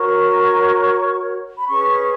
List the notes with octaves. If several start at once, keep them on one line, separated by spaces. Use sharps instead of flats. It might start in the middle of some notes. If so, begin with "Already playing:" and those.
Already playing: F#4 A#4 C#5 C#6
B5
C#4 G#4 B4 C#6